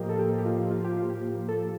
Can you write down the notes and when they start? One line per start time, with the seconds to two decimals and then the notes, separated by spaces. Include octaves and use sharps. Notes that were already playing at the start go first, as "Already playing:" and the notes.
Already playing: A2 F3 A#3 G4 A#4 D#5 G5
0.09 A4
0.19 G4
0.38 G4
0.45 F4
0.71 F4
0.84 G4
0.97 F4
1.10 G4
1.49 A4